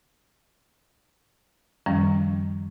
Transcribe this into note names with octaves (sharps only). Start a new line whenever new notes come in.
F#2 D#3 F3 G3 C#4